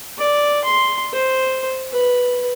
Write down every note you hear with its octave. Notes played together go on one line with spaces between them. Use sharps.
D5
C6
C5
B4